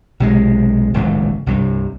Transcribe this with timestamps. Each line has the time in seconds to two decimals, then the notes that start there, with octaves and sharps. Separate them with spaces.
0.20 B1 C3 G3 G#3
0.94 D1 G#1 C#2 E3
1.46 C2 G2 C3